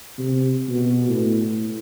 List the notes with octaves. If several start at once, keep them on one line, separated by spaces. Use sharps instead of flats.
C3
B2
A2